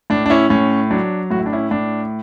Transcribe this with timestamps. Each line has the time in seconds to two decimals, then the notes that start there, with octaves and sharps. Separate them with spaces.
0.10 A2 D4
0.26 D4
0.30 C#4 E4
0.50 A2 C#4
0.91 F#3 D4
1.31 A2 F#4
1.39 E4
1.46 D4
1.52 C#4 E4
1.71 A2 D4